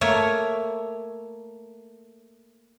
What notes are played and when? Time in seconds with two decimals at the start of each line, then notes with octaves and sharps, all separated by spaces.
0.01 A3 A#3 C#5